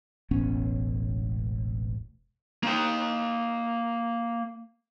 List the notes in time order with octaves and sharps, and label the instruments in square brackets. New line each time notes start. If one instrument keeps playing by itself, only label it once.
[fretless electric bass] E1 A1 B3 C#4
[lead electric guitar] A#3 G5